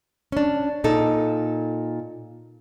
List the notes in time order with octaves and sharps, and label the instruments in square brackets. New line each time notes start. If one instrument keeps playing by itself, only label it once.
[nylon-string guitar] C#4 D4
A#2 D#4 A4